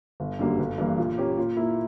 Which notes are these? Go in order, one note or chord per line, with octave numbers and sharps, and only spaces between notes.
G1
F#2 D3 G3 A#3
G1
G2 E3 A#3
A#2
A#3 C#4 G4
A#2
A#3 E4